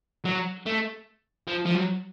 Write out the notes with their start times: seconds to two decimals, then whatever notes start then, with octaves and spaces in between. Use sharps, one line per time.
0.25 F#3
0.66 A3
1.47 F3
1.65 F3
1.75 F#3